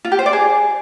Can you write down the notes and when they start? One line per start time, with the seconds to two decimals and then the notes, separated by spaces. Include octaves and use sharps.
0.05 F4
0.12 G4
0.19 C5
0.26 D5
0.33 G#4